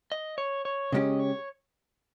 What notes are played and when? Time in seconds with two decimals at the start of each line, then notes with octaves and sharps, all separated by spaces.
0.12 D#5
0.38 C#5
0.65 C#5
0.92 C#3 G#3 C#4 G4 D#5
1.19 C#5